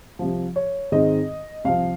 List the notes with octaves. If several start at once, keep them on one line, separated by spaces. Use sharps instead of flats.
C2 C3 F3
C#5
G#2 D#3 G#3 C4 D#5
C2 C3 F3 F5